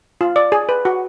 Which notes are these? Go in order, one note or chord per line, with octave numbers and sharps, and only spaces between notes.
F4
D5
G#4
B4
F#4